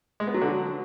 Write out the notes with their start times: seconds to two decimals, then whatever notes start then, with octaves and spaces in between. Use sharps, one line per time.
0.20 G#3
0.27 B3
0.34 F#3
0.42 D3
0.49 F#3